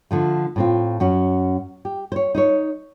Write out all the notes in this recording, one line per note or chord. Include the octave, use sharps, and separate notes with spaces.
D3 F3 A3
A2 C4 F4
F#2 C#4 F#4 F#5
G4
C5 C#5
D#4 C5 C#5